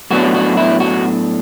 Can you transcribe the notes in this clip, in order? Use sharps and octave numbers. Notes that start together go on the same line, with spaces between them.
A2 F#3 B3 D4 F#4
F#4
E4
F#4